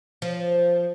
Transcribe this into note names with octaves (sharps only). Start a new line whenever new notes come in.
F3